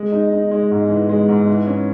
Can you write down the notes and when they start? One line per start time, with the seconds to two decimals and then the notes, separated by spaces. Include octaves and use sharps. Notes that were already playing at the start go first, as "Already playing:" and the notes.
Already playing: G#3
0.12 D#4
0.33 D#4
0.51 G#3
0.71 G#2
0.90 E3
1.09 G#3
1.29 G#2
1.47 E3
1.67 C#4